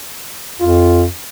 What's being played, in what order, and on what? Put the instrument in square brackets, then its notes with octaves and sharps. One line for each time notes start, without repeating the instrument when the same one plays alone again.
[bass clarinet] F2 [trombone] F4